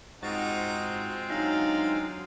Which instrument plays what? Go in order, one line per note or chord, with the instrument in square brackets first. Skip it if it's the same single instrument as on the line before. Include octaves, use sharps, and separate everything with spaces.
[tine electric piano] G#2 F#4 A6 [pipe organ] G#3 C4 F4 [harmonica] D#4
[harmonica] D3 G#4 F5 [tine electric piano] F#3 [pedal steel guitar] D#4